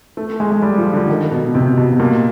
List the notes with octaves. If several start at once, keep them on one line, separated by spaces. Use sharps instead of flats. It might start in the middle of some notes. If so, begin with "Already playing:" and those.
A3
G#3
G#3
G3
F3
D3
D#3
B2
C3
B2
B2
A#2